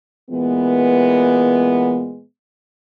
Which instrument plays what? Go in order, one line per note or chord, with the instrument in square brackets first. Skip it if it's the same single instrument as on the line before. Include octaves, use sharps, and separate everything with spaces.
[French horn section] A#2 E3 G#3 B3